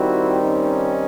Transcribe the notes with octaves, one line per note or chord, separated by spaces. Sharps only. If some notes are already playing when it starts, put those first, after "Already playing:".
Already playing: D#3 G3 C4 E4 F#4
C#4 D#4